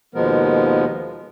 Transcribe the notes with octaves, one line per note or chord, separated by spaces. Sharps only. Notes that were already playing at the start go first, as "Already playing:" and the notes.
D#2 B2 F3 G#3 B3 A#4